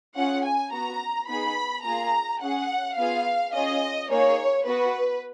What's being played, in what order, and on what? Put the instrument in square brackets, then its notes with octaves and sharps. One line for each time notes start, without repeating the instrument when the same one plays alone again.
[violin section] C#4 F4 G#4 F#5
G#5
B3 F#4 A#5
B3 D#4 G#4 B5
A#3 F4 G#4 A#5
C#4 G#4 F#5
B3 F4 G#4 F5
C#4 F4 G#4 D#5
A#3 D#4 G#4 C#5
B3 F#4 B4